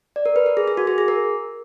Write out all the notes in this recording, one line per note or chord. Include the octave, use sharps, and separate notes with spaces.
D5
A#4
B4
A#4
G#4
G#4
F#4
G#4
G#4
A#4